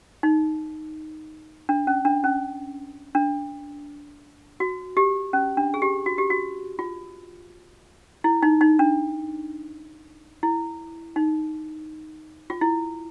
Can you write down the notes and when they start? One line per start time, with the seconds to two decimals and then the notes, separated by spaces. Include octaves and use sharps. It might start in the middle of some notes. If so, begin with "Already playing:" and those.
0.23 D#4
1.69 D4
1.87 C#4
2.05 D4
2.24 C#4
3.15 D4
4.60 F#4
4.97 G4
5.33 C#4
5.57 D4
5.74 G#4
5.82 G4
6.06 F#4
6.18 G4
6.30 F#4
6.79 F4
8.24 E4
8.42 D#4
8.61 D#4
8.79 D4
10.43 E4
11.16 D#4
12.50 F4
12.61 E4